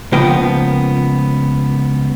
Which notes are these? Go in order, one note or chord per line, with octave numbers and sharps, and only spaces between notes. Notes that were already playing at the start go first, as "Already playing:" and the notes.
C#2 F3 A#3 B3 G5